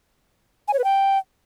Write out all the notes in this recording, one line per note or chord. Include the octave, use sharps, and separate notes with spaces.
G#5
C#5
B4
G5